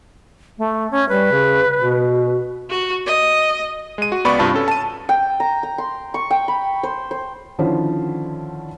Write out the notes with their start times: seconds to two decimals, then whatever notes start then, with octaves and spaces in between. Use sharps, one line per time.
0.58 A3
0.91 C#4
1.09 G3 B4
1.31 C#3
1.79 B2
2.69 F#4
3.06 D#5
3.98 G#3 D#7
4.12 F#4
4.25 C#2 B3 D5 B5 C#6 D6
4.39 G2 C3 F4 A5
4.54 C#4 A4
4.68 A5 D#7
5.09 G5
5.40 A#5
5.63 A#5
5.78 C6
6.14 C#6
6.31 G5
6.48 B5
6.83 C5
7.11 C5
7.58 D3 D#3 F3 C#4 E4 C5